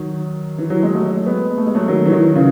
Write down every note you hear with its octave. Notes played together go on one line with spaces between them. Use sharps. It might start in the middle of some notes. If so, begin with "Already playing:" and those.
Already playing: D#3 F#3
E3
F#3
G#3
F#3 A3
G#3 B3
A3
G#3
F#3 A3
D#3 F#3
E3
D#3 F#3
C#3 E3